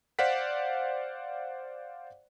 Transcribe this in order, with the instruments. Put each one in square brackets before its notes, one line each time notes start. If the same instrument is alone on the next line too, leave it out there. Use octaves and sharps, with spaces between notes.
[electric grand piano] C5 D5 F5 F#5 B6